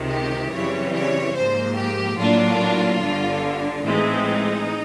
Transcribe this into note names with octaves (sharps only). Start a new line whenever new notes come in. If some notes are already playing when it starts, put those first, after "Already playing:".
Already playing: C#2 C3 D#3
G4
F#2 C#3 E3 G3 C4 C#5
C#5
G#2 F3 A#3 C5
G4
A2 F#3 A#3 D4 F4
G1 G2 D3
A1 A2 E3 G#3 C4 D#4